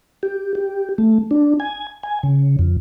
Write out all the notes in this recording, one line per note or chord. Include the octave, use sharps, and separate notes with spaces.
G4
G4
A3
D4
G#5
G#5
C#3
F2